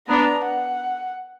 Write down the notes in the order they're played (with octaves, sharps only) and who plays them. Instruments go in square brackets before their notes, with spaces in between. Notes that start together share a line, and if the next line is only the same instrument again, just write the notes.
[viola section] B3 D4 [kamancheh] A#5
[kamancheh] F#5